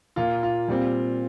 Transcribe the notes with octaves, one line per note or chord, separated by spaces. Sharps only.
A#2 A#3 F4
F4
A#2 G3 C4